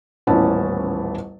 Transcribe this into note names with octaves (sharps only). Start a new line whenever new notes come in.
D#1 A1 B3 C#4 E4 A5